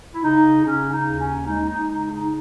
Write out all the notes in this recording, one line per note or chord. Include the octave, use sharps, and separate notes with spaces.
E4
C#3 D#4
C#3 C#4
D#4
D#2
C#4
G#3 D#4
D#4
C#3 D#4
D#4